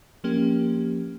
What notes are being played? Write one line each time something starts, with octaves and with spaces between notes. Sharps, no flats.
F3 A#3 C#4 G4